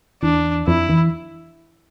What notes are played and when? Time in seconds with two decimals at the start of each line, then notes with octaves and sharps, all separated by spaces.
0.22 E2 D4
0.67 F2 E4
0.89 E2